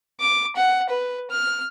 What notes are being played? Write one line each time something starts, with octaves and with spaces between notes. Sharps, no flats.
D6
F#5
B4
F6